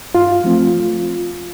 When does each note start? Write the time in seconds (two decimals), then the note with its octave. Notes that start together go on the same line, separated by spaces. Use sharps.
0.14 G2 F4
0.44 F3 A3 C4